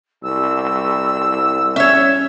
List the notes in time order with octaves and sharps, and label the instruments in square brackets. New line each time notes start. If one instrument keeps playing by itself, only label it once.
[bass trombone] C2 [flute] E6
[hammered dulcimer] C#4 [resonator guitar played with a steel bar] C#5 E5